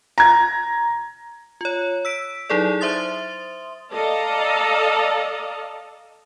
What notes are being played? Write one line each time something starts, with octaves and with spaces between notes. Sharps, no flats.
A#5 G#6
F4 C#5
E6 B6 D7
F#3 D#4 E4 G#4 A4 D5
C5 E5 C6 D#6 A6
A4 D5 D#5 F5 A5 A#5